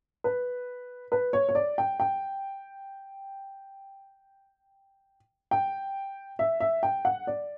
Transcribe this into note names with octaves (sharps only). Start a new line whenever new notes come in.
B4
B4
C#5
C#5
D5
G5
G5
G5
E5
E5
G5
F#5
D5